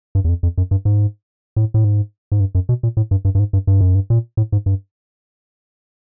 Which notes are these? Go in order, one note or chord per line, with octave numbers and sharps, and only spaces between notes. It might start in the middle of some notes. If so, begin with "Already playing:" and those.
G2
E2
F2
F2
F#2
G2
G#2
A2
A2
G#2
G#2
G2
F#2
B2
A#2
A2
G2
G2
G2
G#2
G2
G2
F#2
G2
A#2
A2
G#2
G2